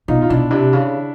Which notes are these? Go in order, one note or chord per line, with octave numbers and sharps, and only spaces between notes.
B2 D#4 F4
F4
B2 D4 E4
C3 D4 E4
C#3